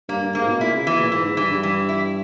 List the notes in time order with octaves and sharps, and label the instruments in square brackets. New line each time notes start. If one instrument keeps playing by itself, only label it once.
[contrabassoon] G2 [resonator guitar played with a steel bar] A#3
[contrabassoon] G2
[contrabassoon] G#2 [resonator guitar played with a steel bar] A#3
[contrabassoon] B2
[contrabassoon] A#2 [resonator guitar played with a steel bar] E4
[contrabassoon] C#3
[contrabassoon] B2 [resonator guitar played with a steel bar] E3
[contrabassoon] A#2
[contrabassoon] G#2 [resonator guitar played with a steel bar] E3
[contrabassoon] G#2
[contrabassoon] G2 [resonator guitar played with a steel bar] E3
[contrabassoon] G2
[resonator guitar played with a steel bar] E3
E4